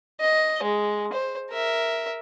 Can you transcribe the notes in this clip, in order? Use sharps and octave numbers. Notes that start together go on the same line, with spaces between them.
D#5
G#3
C5
A#4 E5